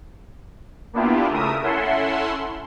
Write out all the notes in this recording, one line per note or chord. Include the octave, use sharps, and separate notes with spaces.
A#3 B3 D4 E4 F4 G4
C#3 A3 A#4 E5 D#6
C#4 E4 A4 E5 F#5 C6